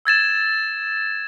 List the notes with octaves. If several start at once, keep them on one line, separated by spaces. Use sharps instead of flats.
E6 G#6 A6 E7